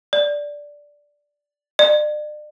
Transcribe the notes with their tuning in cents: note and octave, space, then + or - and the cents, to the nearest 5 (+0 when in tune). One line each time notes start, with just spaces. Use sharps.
D5 -5
D5 +40